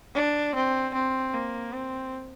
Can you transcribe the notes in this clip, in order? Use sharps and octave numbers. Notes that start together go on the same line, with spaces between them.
D4
C4
C4
A#3
C4